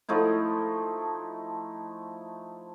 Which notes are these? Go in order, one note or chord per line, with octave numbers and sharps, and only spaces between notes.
F3 A3 D#4 E4